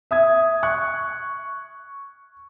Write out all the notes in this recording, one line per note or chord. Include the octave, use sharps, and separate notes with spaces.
E5 D#6 G#6
C#6 F#6 G#6